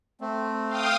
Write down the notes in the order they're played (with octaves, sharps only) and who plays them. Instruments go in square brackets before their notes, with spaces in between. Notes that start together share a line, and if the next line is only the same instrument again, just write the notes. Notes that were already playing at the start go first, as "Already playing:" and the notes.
[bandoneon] A3 C4
[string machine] F5 G5 D#6